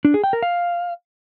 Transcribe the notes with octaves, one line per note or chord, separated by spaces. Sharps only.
D4
G#4
G5
A#4
F5